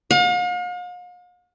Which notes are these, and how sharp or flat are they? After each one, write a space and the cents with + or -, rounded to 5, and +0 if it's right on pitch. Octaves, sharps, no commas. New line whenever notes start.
F5 +45